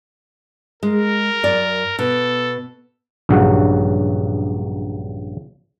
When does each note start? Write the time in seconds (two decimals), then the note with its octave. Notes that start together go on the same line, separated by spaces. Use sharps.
0.83 G#3 A#4
1.43 F#2 D5
1.99 B2 A4
3.29 A#1 G2 C#3 F#3 F#4